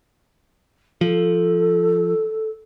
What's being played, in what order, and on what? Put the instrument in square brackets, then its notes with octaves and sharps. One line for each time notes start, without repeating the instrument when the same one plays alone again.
[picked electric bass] F3 [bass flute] A4